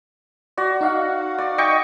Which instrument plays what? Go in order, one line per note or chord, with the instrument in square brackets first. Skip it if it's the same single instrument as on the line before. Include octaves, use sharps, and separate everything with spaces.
[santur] F#4 [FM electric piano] D5
[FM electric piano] D#4 F5 F#5
[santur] D5
D#5 G5 C#6